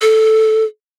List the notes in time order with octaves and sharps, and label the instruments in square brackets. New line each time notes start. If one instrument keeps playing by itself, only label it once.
[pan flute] A4